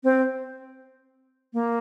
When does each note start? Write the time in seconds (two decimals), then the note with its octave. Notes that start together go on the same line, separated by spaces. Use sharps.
0.04 C4
1.53 A#3